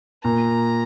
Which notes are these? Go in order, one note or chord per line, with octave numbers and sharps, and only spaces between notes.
A#2 A#5